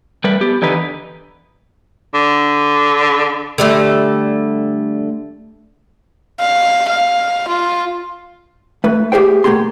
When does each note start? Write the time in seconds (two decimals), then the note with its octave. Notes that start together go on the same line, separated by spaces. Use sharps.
0.24 G3 A3 A#4 B4
0.41 B3 G4
0.62 D3 E3 D#4 G4 B4
2.14 D3
3.58 D3 G3 A3
6.40 F5
6.89 F5
7.48 F4
8.84 A3 B4
9.12 A3 G4 G#4 C5 G5
9.44 B1 A3 A#3 G4 G#4 C6